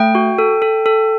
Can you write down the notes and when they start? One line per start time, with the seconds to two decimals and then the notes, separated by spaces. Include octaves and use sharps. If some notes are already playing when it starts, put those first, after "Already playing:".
Already playing: A3 G5
0.15 F#4
0.38 A4
0.62 A4
0.86 A4